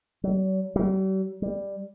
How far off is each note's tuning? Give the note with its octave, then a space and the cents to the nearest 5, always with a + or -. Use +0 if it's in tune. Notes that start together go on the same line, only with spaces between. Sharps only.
F#3 +45
G3 -45
G3 +10